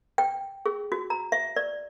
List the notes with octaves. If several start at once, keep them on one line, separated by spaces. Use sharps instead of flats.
G5
G#4
F#4
A#5
E5
D5